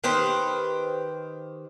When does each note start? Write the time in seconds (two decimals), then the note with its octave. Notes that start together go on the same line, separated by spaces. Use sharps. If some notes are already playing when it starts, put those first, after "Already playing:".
0.04 D#3 G4 B4 C5